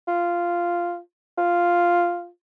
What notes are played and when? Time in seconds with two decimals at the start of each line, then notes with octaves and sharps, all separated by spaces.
0.08 F4
1.38 F4